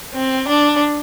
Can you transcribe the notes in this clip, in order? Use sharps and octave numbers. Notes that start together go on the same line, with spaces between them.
C4
D4